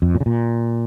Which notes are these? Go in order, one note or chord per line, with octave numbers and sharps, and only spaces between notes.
F2
A#2
C#3
A#2